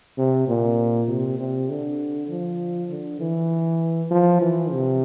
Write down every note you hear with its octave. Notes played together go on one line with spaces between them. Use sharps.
C3
A#2
C3
C3
D3
F3
D3
E3
F3
E3
C3